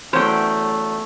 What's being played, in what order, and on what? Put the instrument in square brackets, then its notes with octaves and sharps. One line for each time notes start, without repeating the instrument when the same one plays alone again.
[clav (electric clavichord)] E2 F#3 C#4 [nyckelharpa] A3 [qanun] C5 G5